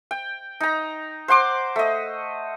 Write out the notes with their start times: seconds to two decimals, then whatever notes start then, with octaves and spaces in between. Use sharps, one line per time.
0.11 G5
0.60 D#4 A#5
1.28 C5 F#5 C6 D6
1.76 A3 D#5